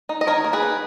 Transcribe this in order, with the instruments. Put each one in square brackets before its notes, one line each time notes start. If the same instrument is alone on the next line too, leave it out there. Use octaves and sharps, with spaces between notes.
[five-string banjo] D#4
D#5
D#3 A#4 C#5
A#3
G#4 B4
D#3